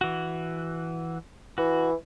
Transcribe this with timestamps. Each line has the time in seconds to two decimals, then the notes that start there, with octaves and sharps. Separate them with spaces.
0.01 E3 F#4
1.58 E3 F#4